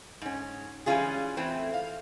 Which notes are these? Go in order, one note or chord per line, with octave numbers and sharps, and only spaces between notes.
G#2 C#4
E3 G3 G#3 C#4 F4 G#4
E3 A3 C4
F5